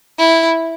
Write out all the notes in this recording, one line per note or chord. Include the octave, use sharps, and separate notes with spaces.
E4